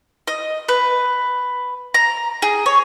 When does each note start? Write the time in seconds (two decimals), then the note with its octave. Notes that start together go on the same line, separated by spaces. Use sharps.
0.27 D#5
0.69 B4
1.94 A#5
2.42 G#4
2.66 C#5